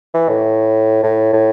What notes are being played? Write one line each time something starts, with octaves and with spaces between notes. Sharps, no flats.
E3
A2
A2
A2